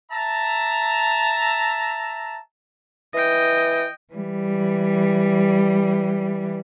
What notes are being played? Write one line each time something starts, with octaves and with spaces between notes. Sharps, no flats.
E5 A5 A#5
E3 D#5 G5
E3 G3